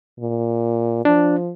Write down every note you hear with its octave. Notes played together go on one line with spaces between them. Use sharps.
A#2
F3 D4